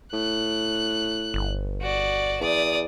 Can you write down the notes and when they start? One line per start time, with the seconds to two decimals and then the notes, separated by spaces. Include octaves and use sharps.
0.13 A2 F#6
1.34 G1
1.81 F#4 D5
2.40 E2 D5 D#6